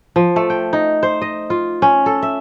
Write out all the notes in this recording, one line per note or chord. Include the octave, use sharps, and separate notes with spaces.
F3
A3
G5
D#4
C5
D#5
F4
C#4
A4
E5